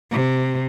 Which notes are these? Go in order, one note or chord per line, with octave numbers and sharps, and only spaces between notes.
C3